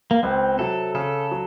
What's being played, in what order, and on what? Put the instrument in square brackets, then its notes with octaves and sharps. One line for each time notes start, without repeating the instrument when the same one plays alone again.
[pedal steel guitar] A#3
[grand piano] C#2 [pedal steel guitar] C4
[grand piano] C3 F#3 [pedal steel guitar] A4
[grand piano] C#3 [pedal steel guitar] A4
[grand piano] F#3